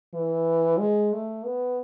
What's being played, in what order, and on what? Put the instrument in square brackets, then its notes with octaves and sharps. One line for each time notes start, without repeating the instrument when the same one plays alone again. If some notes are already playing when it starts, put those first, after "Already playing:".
[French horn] E3
G#3
A3
B3